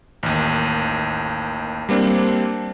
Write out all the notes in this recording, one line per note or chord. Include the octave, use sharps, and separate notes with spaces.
A1 D#2
G3 A#3 C4 D4